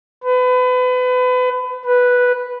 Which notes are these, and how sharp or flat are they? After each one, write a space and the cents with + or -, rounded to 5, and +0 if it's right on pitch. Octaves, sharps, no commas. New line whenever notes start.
B4 +30
B4 -5